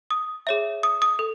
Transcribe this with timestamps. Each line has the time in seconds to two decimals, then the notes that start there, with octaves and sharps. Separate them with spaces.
0.10 D#6
0.47 G#4 C#5 E5
0.83 D#6
1.02 D#6
1.19 A4